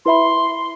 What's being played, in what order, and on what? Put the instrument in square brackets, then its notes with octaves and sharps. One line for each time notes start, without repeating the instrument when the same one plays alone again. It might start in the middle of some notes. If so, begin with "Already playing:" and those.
[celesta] E4 B4 E5 B5 [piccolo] C6